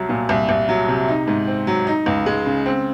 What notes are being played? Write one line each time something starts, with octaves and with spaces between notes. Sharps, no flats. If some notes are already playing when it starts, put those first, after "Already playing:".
Already playing: C2 F#3
A#2
C2
C2
F#3
C3
D#4
G#2
C4
F#3
D#4
C#2
G#3
C#3
C4